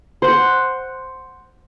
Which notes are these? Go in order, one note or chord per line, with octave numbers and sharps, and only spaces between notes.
C5 F#5